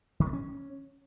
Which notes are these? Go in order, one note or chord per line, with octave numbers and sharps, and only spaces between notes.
D#3
B3
C#4